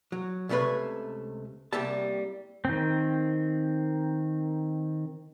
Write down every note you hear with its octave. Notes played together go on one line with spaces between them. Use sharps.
F#3
C#2 C3 A3 C#4 B4 C#5
C2 G3 A#3 G4 E5 A5
D#3 C4